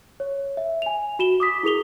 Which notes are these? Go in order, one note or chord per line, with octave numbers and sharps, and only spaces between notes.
C#5
E5
G#5 F7
F#4 E7 G7
D6 D#6 B6
E4 G#4 A#4 F7 G7